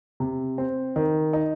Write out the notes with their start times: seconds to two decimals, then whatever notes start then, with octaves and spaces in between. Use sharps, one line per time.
0.20 C3
0.58 C4
0.96 D#3
1.33 D#4